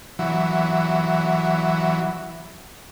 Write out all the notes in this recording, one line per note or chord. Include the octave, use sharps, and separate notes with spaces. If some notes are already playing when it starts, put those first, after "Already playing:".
E3 F#3